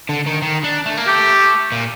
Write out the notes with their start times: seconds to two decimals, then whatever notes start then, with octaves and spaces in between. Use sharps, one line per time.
0.09 D3
0.26 D#3
0.42 D#3
0.64 D4
0.86 A3
0.97 A#3
1.07 A3 G4
1.72 A#2